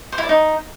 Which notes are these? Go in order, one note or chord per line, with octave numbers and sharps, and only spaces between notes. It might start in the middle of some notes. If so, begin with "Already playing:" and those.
C5
E4
D5
D#4